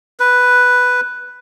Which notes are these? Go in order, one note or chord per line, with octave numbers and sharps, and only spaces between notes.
B4